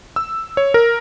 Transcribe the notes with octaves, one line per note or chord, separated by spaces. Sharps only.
E6
C#5
A#4